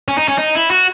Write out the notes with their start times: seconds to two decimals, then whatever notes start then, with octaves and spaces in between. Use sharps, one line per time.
0.08 C#4
0.18 D#4
0.28 C#4
0.39 D#4
0.55 E4
0.71 F#4